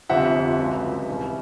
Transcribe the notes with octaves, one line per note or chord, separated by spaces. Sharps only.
G1 F2 C3 F3 E5 F#5
C#2 C#3 F#3
C2 C3 E3